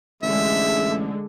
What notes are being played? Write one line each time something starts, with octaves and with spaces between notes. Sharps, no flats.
A1 D3 G#3 E5